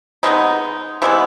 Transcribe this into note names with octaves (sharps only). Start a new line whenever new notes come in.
C3 E3 G#3 B3 D#4
C3 E3 G#3 B3